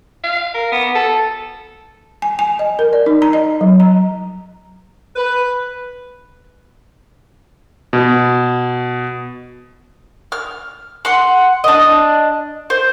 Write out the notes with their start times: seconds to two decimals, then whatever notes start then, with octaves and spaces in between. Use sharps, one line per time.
0.24 F5
0.54 A#4
0.72 B3
0.95 A4
2.22 G#5
2.39 G#5
2.59 D#5
2.79 A#4
2.93 D5
3.06 D#4
3.22 A#5
3.33 D#5
3.61 F#3
3.80 A#5
5.16 B4
7.93 B2
10.32 F6
11.05 F#5 C6
11.64 D4 D#5
12.70 C5